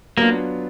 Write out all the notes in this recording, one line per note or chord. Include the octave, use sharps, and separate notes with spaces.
F#3 A#3 B3 D4 F4